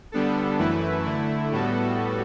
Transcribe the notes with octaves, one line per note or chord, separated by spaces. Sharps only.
D3 G3 B3 D4 A4
F#2 E3 A3 E4 B4
D3 A3 E4
A2 G3 B3 F#4 A4